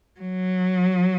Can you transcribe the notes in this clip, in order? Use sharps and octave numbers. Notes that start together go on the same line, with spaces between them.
F#3